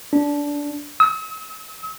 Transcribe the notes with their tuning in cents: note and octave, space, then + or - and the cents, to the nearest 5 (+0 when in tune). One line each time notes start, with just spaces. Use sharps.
D4 -15
E6 -45